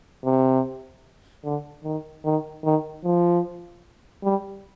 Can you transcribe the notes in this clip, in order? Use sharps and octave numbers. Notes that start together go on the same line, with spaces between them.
C3
D3
D#3
D#3
D#3
F3
G3